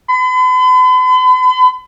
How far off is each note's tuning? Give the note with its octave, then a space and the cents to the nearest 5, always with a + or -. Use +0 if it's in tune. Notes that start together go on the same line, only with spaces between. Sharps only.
B5 +45